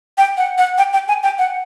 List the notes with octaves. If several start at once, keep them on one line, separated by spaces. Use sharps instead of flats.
G5
F#5
F#5
G5
G5
G#5
G5
F#5